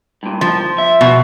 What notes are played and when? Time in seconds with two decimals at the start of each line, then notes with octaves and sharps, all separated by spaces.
0.23 G2 A#2
0.41 F3
0.78 E5
1.01 B2